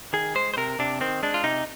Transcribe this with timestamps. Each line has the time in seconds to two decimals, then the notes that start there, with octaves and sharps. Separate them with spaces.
0.13 D#3 G#4
0.35 G#3 C5
0.54 C5
0.57 C3 A#4
0.79 C3 D4
1.01 D#3 C4
1.23 G#3 D4
1.34 F4
1.44 C3 D#4